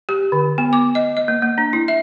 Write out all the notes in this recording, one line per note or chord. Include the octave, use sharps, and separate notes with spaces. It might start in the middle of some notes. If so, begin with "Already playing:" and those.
G4
D3
B3
D6
D#5
D#5
A#3
A#3
D4
E4
E5